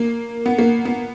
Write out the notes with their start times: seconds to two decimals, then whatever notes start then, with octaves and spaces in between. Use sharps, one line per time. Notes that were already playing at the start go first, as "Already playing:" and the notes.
Already playing: A#3
0.46 B3
0.59 A#3
0.85 B3